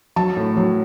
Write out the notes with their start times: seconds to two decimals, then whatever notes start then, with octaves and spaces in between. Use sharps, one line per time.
0.16 F#3 A5
0.37 A2
0.57 F#3